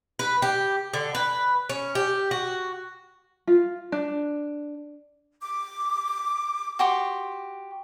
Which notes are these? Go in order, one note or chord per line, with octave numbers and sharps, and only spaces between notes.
B4
G4
D3
B4
C#4
G4
F#4
F4
D4
D6
F#4 G4 C6